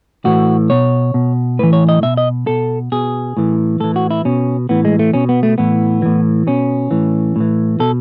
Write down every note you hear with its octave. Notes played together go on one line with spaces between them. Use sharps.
A2 E3 F#4
B2 C#5
B2
A2 E3 B4
C#5
D#5
B2 E5
D#5
B2 A4
B2 G#4
A2 E3
A2 E3 A4
F#4
E4
B2 C#4
A2 E3 B3
G#3
A3
B2 C#4
B3
A3
A2 E3 B3
A2 E3
B2 C#4
A2 E3
A2 E3
B2 A4